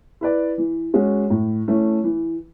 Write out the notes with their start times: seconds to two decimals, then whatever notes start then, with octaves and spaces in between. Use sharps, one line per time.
0.21 E4 B4 D5
0.58 E3
0.94 G#3 C#4 F#4
1.30 A2
1.68 E3 A3 C#4
2.04 E3